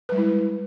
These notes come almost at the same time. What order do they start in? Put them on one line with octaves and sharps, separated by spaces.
B4 G3 G#3 E4